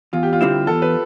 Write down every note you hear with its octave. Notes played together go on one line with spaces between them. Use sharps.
E2 F4
G4
F4
D3 G3 C4 E4
E2 A4
B4